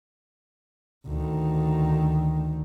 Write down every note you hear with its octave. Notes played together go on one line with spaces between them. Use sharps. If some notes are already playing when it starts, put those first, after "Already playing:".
D2 D#3